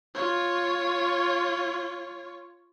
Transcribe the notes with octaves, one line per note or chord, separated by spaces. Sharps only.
F4 C#5